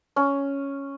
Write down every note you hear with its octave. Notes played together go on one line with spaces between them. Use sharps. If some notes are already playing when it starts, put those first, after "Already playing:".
C#4